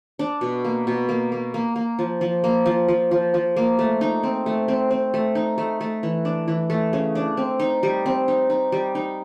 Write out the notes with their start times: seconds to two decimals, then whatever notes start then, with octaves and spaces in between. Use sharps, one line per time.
0.19 D4
0.41 B2
0.64 A#3
0.87 B2
1.09 A#3
1.32 A#3
1.54 A#3
1.76 A#3
1.99 F3
2.21 F3
2.44 A#3
2.66 F3
2.88 F3
3.11 F3
3.34 F3
3.56 A#3
3.79 A3
4.01 D#4
4.23 C4
4.46 A3
4.68 C4
4.91 C4
5.14 A3
5.35 D#4
5.58 A3
5.81 A3
6.03 E3
6.25 D4
6.48 E3
6.70 A3
6.93 C#3
7.15 D4
7.37 C4
7.60 D#4
7.83 G3
8.06 C4
8.28 D#4
8.50 D#4
8.72 G3
8.95 D#4